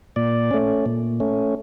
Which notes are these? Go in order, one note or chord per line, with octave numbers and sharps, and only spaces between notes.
A#2 D5
A3 C#4
A#2
A3 C#4